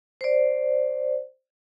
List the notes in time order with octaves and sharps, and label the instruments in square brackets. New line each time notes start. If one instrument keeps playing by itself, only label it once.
[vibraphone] C5 D5